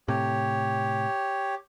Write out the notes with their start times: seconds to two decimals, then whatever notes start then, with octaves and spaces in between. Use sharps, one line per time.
0.08 A2 C3 G4 C#5